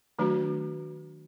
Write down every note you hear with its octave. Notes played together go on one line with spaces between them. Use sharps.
D#3 F#3 A3 D4 F#4